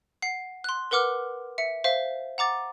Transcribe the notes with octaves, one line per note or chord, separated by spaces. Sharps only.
F#5 C7
C6 F#6
A#4 B4 F#5 D6 F6
E5 C#7
C5 E5 F5
F#5 A#5 D6 A6